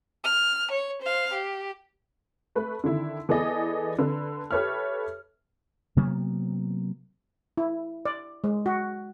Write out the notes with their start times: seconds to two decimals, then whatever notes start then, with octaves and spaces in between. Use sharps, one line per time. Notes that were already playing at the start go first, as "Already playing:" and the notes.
0.24 F6
0.71 C#5
1.02 C5 F5
1.33 G4
2.55 A3 B4
2.84 D3 D#3 E4
3.29 E3 B3 G#4 A4 D5 D#5
3.99 D3 B4
4.51 G4 A4 B4 C#5 E5 F6
5.97 C3 F#3 A#3 B3
7.58 E4
8.05 D5
8.44 G#3
8.66 F#4